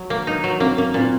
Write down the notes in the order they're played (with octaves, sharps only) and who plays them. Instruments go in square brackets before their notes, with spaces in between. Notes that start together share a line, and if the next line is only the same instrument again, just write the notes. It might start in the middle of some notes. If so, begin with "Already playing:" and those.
Already playing: [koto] F#3
A#3
D#4
F#3
[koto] A#3 [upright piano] C4
[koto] A#3 [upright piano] C#4
[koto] A#2 [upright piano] C4